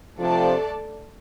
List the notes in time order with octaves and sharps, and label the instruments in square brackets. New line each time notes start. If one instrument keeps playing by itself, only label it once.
[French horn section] C3 F3 [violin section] A3 D4 A4 D5 A5